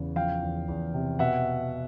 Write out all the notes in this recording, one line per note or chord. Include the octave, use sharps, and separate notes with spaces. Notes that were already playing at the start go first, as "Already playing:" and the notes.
Already playing: E2 C#3
F3 F5 G5
E2
E2
C3
B2 E5 F#5